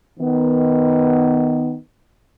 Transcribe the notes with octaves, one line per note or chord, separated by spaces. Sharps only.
D#3 B3